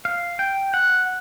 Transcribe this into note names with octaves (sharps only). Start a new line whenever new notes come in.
F5
G5
F#5